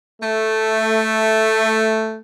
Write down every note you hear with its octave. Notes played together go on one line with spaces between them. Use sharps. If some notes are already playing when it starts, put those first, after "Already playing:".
A3